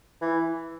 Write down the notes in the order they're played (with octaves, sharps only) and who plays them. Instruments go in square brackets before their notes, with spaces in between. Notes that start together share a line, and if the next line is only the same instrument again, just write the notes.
[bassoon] E3